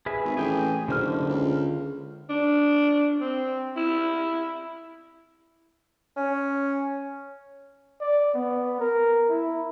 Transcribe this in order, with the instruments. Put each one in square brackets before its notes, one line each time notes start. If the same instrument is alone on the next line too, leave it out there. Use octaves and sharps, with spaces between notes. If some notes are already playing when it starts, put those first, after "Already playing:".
[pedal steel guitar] G#4 B4 E5
[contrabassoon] G#1
[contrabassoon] A1 [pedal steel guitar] G#4 G5
[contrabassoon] F#1 [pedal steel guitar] D3 C5 F6
[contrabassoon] C#2
[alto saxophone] D4
C4
E4
[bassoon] C#4
[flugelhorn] D5
B3
A#4
E4